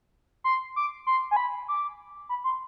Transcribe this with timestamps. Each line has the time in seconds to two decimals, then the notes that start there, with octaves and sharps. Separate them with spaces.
0.44 C6
0.76 D6
1.07 C6
1.31 G#5
1.36 B5
1.68 D6
2.29 B5
2.44 C6